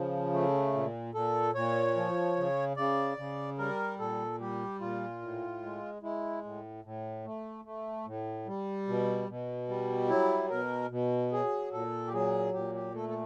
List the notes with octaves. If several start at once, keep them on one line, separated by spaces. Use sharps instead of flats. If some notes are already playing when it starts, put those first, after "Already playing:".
Already playing: C#3 F3
A3
A#2
A#2 A4
A#2 C#5
F3
C#3
C#3 D5
C#3
G3 A#4
A#2 A4
G3 G4
A#2 F4
A2
G#3
G#3 E4
A2
A2
A3
A3
A2
G3
B2
B2
G3
F#3 E4
B2 A#4
B2
F#3 G#4
A#2 A4
G4
F#3 G#4
A#2 G4
G4
A3 A4
A4